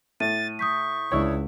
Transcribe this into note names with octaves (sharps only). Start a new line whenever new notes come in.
A2 A6 D#7
C#6 D#6 G6 B6
C#2 D4 E4 C#5